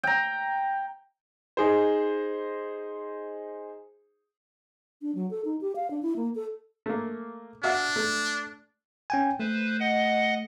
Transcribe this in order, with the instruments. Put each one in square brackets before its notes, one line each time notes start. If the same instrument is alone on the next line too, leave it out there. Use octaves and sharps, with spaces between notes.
[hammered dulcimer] G5 A#5
[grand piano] D#4 G#4 C5
[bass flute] D4
F#3
A4
D#4
G4
F5
D4
E4
A#3
A4
[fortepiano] A3 A#3
[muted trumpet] D4 [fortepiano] F#4 E5 F5
[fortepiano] A3
[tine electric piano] C#4 G5 G#5
[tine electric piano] A3 [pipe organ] B4 C5
[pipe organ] D#5 F#5